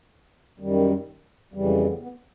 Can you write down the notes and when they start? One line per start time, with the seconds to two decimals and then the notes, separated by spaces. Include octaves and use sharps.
0.60 F#2 D#3 G3
1.54 F2 C#3 E3 G3
1.65 G#3
1.77 A#3
1.89 B3
2.01 B3